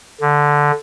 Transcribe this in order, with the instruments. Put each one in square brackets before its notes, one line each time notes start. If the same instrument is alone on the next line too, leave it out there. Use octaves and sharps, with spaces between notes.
[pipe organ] D3